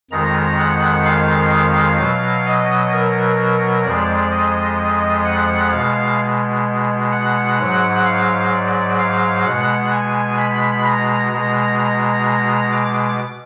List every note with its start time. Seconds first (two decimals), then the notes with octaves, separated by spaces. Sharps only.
0.11 F2 D#3 G#3 A#5
0.58 F#5
1.05 F5
1.98 B2 F#3
2.45 D#5
2.92 A#4
3.85 F2 F3 G#3 D5
4.31 D#5
5.25 F#5
5.72 B2 G#3 F5
7.12 F#5
7.58 G#2 F#3
8.05 F5
8.52 D5
8.99 F5
9.45 B2 G#3 F#5
9.91 G#5
10.38 B5
10.85 A#5
11.32 B2 G#3
11.79 A#5
12.26 A#5
12.72 D6